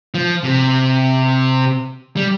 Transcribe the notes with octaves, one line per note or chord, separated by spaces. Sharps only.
F3
C3
G3